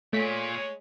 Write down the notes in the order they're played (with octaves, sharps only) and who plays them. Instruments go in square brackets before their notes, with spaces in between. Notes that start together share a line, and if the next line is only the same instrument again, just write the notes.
[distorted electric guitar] A#2 [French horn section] G#3 C#5 [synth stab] A3 B6